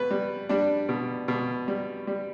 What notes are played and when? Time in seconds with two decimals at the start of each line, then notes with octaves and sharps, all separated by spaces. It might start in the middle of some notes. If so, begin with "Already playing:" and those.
Already playing: B2 B4
0.11 G3
0.49 G3 D4
0.89 B2
1.28 B2
1.68 G3
2.07 G3